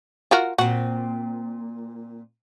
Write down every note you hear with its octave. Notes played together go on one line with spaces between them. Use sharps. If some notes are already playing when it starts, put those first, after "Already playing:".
F4 F#4 A#4
A#2 C4 F#4